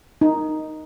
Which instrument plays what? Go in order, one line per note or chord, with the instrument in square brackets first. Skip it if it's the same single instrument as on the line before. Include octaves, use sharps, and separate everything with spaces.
[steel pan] D#4